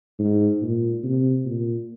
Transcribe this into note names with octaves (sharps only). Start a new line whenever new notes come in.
G#2
A#2
C3
A#2